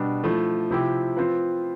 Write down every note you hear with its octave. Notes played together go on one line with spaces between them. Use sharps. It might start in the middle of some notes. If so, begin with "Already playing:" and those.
Already playing: B2 G3 D4
F3 A3 E4
C3 F3 C4 E4 G4
F3 C4 F4 B4